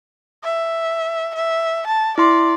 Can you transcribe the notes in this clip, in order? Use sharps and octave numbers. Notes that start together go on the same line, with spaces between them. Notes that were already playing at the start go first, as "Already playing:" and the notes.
E5
E5
A5
E4 D5 C6